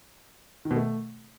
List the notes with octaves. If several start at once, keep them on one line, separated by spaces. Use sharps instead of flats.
D#3
B2
A3